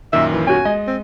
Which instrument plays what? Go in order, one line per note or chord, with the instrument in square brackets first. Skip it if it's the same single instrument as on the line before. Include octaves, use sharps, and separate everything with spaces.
[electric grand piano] F#2 A#2 D#3 [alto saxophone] E5
[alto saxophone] E3
[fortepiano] C#4 F#4 [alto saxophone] G#5
[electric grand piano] G#3 [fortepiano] D#5
[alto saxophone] C4